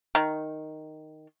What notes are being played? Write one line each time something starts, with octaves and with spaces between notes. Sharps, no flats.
D#3